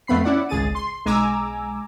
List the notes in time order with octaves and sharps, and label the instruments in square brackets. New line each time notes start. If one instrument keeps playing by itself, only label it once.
[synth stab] F2 A3 B3 B5 C7
C#4 E4 D5 F#5
G#1 C#2 G#4 A6 D#7
C6
B1 G#3 G#5 A#5 D6 E6